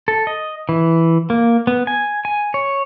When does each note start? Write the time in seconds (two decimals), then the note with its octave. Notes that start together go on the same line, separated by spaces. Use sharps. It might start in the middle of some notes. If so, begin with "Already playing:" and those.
0.08 A4
0.27 D#5
0.69 E3
1.30 A#3
1.67 B3
1.87 G#5
2.25 G#5
2.54 C#5